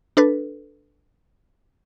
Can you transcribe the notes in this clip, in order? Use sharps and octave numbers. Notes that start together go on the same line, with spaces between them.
D4 A4 B4